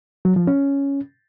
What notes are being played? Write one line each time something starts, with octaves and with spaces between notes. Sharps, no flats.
F#3
F3
C#4